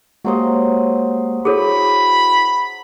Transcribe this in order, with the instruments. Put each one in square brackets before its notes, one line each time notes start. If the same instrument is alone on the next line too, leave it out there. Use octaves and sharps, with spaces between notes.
[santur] F#3 C5 D#5 [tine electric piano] G#3 A#3 G4
[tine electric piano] E4 F#4 [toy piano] G#4 A4 C#5 [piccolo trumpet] B5